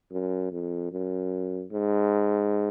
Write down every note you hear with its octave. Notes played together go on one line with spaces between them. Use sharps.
F#2
F2
F#2
G#2